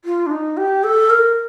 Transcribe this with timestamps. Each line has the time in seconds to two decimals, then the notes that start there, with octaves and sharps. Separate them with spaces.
0.05 F4
0.26 D4
0.31 D#4
0.57 G4
0.84 A4
1.10 A#4